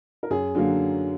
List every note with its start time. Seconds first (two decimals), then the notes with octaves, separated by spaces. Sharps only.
0.23 A#4
0.30 F#2 G#4
0.55 D3 F#3 A#3